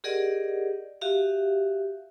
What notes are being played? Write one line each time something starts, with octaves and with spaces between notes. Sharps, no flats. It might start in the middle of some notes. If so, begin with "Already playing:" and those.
G4 G#4 A#4 D5 D#5 F#5
F#4 G4 E5 F5